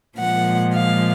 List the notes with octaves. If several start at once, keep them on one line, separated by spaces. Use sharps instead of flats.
A#2 F3 G#3 F#5
F5